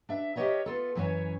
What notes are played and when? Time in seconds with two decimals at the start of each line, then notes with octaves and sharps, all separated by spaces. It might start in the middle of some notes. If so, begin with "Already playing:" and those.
0.09 D4 E5
0.36 G4 A#4 C5 C#5 D#5 E5
0.66 B3 F4 A4
0.95 F#2 E3 C#4 F#4 C#5 G#5